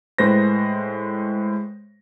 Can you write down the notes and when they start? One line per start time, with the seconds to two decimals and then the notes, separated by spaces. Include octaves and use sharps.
0.18 A2 G#3 B4 C5 A#6